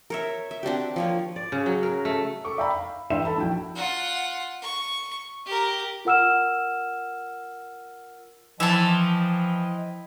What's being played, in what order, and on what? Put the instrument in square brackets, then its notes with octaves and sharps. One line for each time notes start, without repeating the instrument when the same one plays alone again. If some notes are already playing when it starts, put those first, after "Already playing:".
[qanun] A#4 C#5 E5
E5
C4 D4 F#4 G4
F3 A#3 C#5
[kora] D5
C#3
F#3
A#4
A3
[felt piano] A4 C#6 D6
D5 E5 G5 A#5 B5
F5
G2 E3 E5 G5 C6 E7
A4 A5 B5
A#1 E4 F#4 G5
[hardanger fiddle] F4 F#5
C#6
G4 A#4
[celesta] F4 A#4 F#5 E6 F6 E7
[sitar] E3 [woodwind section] F3 [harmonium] D#5 G5 [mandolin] E5 A5